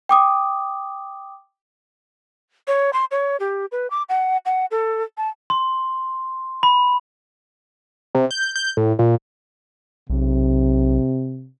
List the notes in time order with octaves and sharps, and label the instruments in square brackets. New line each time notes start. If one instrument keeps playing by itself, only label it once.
[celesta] G5 D6 D#6
[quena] C#5
C6
C#5
G4
B4
D6
F#5
F#5
A4
A5
[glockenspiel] C6
B5
[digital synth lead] C3
G6
G6
A2
A#2
[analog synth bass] B1 [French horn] C3